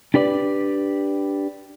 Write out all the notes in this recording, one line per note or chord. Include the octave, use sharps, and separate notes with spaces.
D4 G4 B4 D5